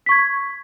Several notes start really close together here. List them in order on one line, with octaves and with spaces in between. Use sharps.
B6 C#6 G#6